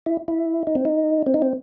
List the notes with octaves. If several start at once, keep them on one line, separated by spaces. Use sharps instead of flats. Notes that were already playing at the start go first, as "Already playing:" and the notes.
E4
E4
D#4
C4
D#4
C4
D#4
C4